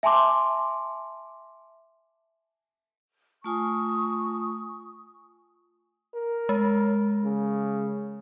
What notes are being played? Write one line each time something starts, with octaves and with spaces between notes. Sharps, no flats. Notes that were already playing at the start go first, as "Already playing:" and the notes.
E5 G#5 A5 C6 D6
A3 F4 G#5 C#6 D#6
A#4
G#3
C#3